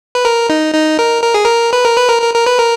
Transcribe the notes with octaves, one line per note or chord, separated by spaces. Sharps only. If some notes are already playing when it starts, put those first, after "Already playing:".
B4
A#4
D#4
D#4
A#4
A#4
G#4
A#4
B4
A#4
B4
A#4
A#4
A#4
B4
A#4